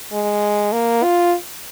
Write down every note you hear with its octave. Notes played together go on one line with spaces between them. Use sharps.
G#3
A#3
F4